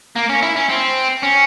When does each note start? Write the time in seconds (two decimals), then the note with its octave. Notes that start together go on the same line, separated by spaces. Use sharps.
0.16 A#3
0.29 C#4
0.42 E4
0.56 C#4
0.69 C4
1.23 C#4